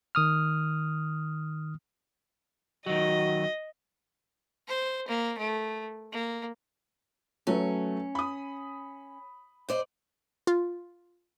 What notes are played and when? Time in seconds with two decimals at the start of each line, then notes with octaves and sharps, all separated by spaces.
0.15 D#3 D#6 F6
2.86 D#3 F#3 F#4 D#5
4.68 C5
5.08 A#3
5.38 A3
6.12 A#3
7.47 F#3 A3 C#4 B4
8.15 B5 D#6
9.69 C5 D5 D#5
10.47 F4